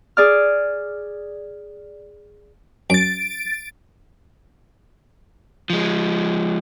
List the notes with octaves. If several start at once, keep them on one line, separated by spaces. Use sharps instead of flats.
G#4 D5 F6
F#2 A6 D7
F3 G#3